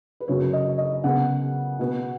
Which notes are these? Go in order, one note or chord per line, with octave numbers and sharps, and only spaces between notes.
B4
F#2 C#3 F#3 C#5
D#5
D#5
C#3 B3 F#5
B2 B3